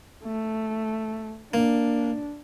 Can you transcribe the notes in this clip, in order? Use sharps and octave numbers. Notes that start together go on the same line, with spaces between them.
A3
A#3 D4